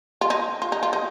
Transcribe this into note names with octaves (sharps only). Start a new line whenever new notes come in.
F4
D#4
F4
D#4
F4
D#4